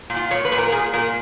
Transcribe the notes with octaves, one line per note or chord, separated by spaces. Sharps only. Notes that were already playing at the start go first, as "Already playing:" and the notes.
A#2
F4
A#2 C#5
B4
A#2
A#4
A#2 G#4
A#2 A#4